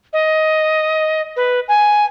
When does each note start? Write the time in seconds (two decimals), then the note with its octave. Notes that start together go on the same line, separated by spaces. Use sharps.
0.13 D#5
1.36 B4
1.68 G#5